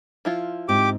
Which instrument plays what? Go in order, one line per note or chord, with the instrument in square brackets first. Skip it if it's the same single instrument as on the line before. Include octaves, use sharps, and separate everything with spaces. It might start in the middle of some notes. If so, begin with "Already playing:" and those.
[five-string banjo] F3 E4 F4
[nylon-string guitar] G#2 C4 [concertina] G4 D6